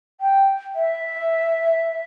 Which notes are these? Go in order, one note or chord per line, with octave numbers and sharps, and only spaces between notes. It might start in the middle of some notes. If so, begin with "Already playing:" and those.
G5
E5